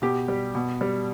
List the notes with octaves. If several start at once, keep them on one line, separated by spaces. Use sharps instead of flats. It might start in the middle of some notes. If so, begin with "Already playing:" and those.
B2 G4
G3
B2
G3